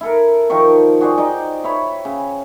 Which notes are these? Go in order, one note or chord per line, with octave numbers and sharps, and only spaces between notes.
E4 A4 A#4
D#3 F3 A#4 C#6
F#4 G#4 C5 D5
D#4 D5 D#5 G5
E4 C#5 B5
C#3